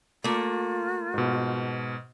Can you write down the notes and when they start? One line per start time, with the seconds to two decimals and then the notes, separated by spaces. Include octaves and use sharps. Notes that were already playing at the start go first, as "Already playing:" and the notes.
0.24 A3 A#3 F4
1.14 G#2 B2